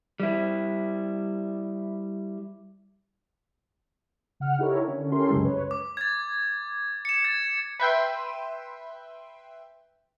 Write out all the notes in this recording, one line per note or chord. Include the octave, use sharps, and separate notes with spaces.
G3 E4
C#3 F#5 F6
D#4 E4 G4 A4 A#4 C#5
D3 C#4
C#4 E4 G4 A4 A#4 C6
C2 F#2 C#3 G#3
B4 C#5
D6
G#6 A6
C#7 E7
G#6 A6
B4 E5 G5 C6